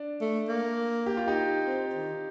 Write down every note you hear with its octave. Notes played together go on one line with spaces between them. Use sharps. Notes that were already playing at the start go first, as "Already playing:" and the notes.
Already playing: D4
A3
A#3
G4
F4
D#4 G4
C4
D#3